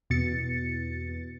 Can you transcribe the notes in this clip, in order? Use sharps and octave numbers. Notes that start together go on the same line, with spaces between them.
E2 B2 A6 C#7